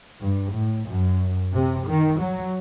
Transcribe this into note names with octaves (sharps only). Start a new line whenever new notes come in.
G2
A2
F#2
C3
D#3
F#3